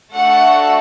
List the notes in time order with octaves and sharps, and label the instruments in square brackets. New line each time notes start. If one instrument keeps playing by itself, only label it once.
[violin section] A3 D4 F#4 A4 F#5